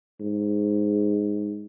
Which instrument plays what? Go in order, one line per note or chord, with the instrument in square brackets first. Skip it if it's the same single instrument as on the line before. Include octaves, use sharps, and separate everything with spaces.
[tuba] G#2